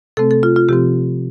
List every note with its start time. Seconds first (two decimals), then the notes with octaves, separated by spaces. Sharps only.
0.17 C3 A3 C4 A4
0.31 A4
0.43 F4
0.56 F4
0.69 C3 F3 C4 G4